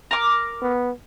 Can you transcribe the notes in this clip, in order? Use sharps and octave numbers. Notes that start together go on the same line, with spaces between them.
A#4 D6
B3